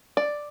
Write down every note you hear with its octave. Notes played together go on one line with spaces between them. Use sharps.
D5